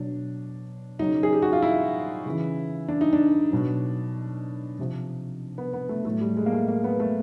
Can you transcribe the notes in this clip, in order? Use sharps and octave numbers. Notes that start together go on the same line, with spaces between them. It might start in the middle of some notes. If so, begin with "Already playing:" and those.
Already playing: B2 F#3 D4
C#3 F#3 D#4
G#4
G4
F#4
F4
E4
C#3 E3
D4
D#4
D4
B2 F#3
C3 F3
B3
B3
A3
A2 F#3 A3
G3
G#3
A#3
A3
A#3
B3
A3